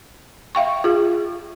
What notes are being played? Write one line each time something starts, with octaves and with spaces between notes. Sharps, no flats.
E5 F5 G5 C#6
F4 G#4